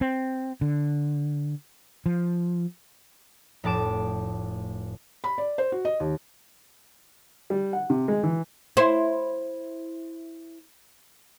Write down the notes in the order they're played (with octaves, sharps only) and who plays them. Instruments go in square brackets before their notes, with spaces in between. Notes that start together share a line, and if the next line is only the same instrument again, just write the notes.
[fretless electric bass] C4
D3
F3
[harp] F1 A2 A5 D6 E7
[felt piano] B5
D5
C5
F#4
D#5
D#2
[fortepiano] G3
F#5
C3
G#3
E3
[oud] E4 C5